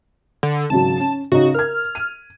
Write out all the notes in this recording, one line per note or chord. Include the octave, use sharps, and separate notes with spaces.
D3
G#1 C#3 F#3 A5
C#4
C#3 C#4 D#4 F#4
A#4 F6 G#6
D#7